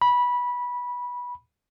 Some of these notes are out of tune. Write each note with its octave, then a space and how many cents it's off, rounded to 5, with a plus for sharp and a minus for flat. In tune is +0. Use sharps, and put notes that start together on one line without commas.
B5 -15